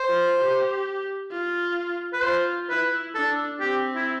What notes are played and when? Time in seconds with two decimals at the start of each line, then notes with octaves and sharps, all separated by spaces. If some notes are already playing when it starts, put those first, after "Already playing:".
Already playing: C5
0.08 F4
0.39 G4
1.31 F4
2.13 B4
2.23 F4 C5
2.70 E4 B4
3.15 D4 A4
3.61 C4 G4
3.96 E4